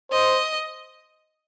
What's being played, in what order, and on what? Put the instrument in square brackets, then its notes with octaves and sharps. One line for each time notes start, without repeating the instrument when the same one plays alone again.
[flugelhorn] C5 [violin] D#5